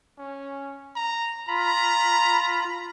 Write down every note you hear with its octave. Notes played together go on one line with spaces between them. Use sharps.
C#4
A#5
F4 A#5 B5